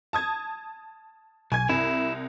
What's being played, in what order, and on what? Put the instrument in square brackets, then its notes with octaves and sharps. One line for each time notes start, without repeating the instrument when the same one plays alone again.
[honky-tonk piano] A5 D#6 G#6
[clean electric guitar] B1 [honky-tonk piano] G#5 G#6
[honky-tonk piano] C2 [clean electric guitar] E4